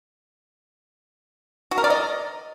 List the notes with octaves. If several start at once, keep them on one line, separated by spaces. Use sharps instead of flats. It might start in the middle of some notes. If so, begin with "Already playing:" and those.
F#4
A#4
D5
D#5